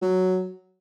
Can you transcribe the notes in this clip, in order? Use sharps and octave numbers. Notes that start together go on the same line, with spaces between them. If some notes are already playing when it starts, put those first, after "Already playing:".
F#3